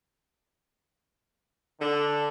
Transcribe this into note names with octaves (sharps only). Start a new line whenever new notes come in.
D3